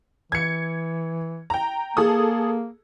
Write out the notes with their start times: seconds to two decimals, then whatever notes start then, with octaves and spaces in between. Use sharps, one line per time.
0.32 E3 G#6 C#7
1.50 G5 A#5
1.97 A#3 G#4 A4 D#6